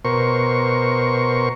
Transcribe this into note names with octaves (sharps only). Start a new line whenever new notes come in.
B2 A#4 C5 C#6